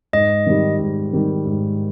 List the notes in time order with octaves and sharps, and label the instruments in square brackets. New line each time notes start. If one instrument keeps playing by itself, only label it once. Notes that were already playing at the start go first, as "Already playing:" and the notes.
[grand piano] G#2 [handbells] D#5
[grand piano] D#3 G3
G#2
D#3 G3
G#2